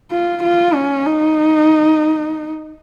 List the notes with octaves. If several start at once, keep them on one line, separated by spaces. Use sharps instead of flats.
F4
F4
C#4
D#4